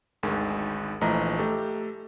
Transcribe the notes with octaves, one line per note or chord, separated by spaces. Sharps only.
G#1 D2 D#3 G#3
A#1 E3 F3 A3 D#5 A#5
A3 G4 A4